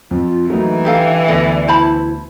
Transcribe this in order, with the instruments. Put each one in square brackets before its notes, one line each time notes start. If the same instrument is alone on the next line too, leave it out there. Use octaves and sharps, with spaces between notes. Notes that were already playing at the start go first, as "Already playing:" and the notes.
[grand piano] F2 [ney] F4
[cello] E3 [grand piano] F#3 A3 A#3 [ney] D#4
[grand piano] D4 [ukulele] G4 A4 F5
[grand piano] D2 B3 [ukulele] A4 D#5 [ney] D5
[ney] E4 [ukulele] C5 A5 B5